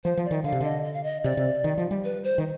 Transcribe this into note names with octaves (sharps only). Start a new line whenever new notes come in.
F3 C5
F3
D5
D#3
D3 F5
C3
D3 D#5
D#5
F5
D#5
C3 D5
C3
D#3
F3
G3
B4
C5
D#3